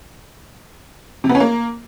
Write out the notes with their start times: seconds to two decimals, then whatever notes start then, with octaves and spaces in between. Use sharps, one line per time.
1.24 C3
1.29 B3
1.35 C#4
1.40 A#3